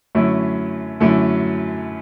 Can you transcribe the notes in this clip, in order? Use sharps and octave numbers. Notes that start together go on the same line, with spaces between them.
F#2 D3 A3 C#4 E4
F#2 D3 A3 C#4 E4